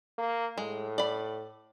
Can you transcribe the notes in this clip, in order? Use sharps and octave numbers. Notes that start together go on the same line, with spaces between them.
A#3
A2 G#3
D5 B5